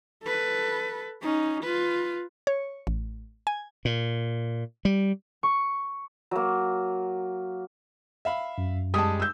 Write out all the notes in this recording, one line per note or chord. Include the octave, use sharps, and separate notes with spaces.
A4 B4
C#4 D#4
F4 B4
C#5
A1
G#5
A#2
G3
C#6
F#3 A#3
E5 F5 B5
F#2
G3 G#3 A5 D#6
E6 G6